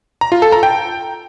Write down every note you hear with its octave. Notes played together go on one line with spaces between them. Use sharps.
A#5
F4
A4
A#5
G5